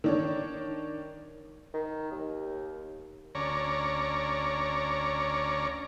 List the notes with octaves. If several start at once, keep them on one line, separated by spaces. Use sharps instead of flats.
D#3 D4 C#5
D#3
D#2
D2 C#4 C#5 D5 A#5